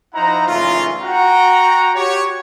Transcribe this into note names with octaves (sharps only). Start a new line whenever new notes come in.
F3 D#4 E4 C5 F#5 A#5
F#1 E3 A3 C#4 D#4 F4
F#4 F#5 G5 A#5
F#4 G4 C#5